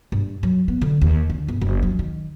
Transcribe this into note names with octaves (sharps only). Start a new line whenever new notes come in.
G2
F#3
B3
D3
D#2
D3
G1
F#1
F#3
D#3